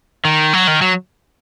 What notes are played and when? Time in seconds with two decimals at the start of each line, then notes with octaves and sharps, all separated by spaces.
0.25 D#3
0.53 F#3
0.67 D#3
0.82 F#3